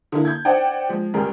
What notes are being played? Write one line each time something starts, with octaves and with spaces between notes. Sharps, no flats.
D3 A#3 E4
G6 G#6
C5 D5 F#5 G5
F3 G#3
C#2 G3 G#4 A#4